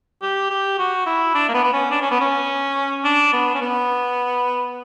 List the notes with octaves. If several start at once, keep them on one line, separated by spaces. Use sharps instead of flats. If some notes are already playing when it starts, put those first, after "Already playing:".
G4
G4
F#4
E4
D4
A#3
B3
B3
C#4
D4
C#4
B3
C#4
D4
B3
C#4
B3